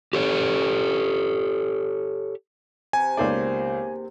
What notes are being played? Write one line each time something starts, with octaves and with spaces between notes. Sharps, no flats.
G4 A4 C#5
C3 G#5
C#2 D#3 A#3 B3 C5 D5